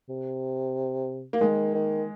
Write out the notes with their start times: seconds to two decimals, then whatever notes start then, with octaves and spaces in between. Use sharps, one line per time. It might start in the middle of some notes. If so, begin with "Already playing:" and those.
0.09 C3
1.33 A#3
1.41 D#3 G#3
1.74 D#3